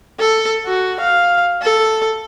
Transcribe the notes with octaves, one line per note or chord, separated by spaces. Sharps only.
A4
F#4
F5
A4